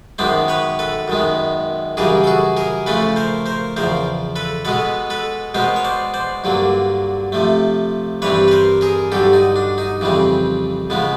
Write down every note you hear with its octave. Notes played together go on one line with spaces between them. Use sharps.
F#2 D#3 G#3 B3 C5 D5
B4 C#5
A4 B4
F#2 D#3 G#3 B3
F#2 C#3 E3 G3 G#4 A#4
A4
F#4 G#4
G#4 A#4
C#3 F3 A3 C#4 A4 B4
A#4 C5
A#4 C5
E2 C#3 F3 A#4 C5
A4 B4
B2 G#3 B3 A4 B4
A4 B4
B2 G#3 B3 A#4 C5
C#5
C5 D5
C5 D5
G2 D3 F#3 A#3
C3 F3 A3
G2 E3 G3 C4 B4 C#5
B4
A#4 C5
G#4 A#4
G2 D3 F#3 G4 A4
D#4
D4
D#4
F2 C#3 E3 G3 C4
C#3 F3 G#3 B3